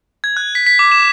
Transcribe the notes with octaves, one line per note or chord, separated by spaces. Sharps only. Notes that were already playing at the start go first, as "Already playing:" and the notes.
G#6
F#6
B6
B6
D6
E7